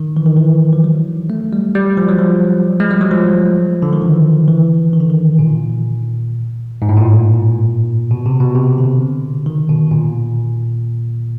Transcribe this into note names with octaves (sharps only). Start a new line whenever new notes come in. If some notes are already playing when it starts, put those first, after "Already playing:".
Already playing: D#3
E3
D#3
E3
F3
F#3
A3
G3
G3
F3
F#3
F3
G#3
G3
F#3
F3
D3
D#3
E3
E3
D#3
D3
D#3
A#2
G#2
A2
A#2
B2
C3
B2
C3
D3
D#3
B2
A#2